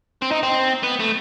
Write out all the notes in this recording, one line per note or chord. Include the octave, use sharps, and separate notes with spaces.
C4
D#4
C4
B3
A3